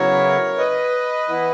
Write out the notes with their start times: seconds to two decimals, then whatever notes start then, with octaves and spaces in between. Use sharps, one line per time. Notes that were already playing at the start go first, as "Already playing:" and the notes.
Already playing: C#3 F#3 B3 E4 A#4 C#5
0.58 B4 D#5
1.29 E3 B3 E4